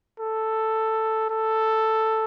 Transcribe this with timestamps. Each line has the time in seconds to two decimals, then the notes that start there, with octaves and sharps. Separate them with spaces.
0.20 A4
1.30 A4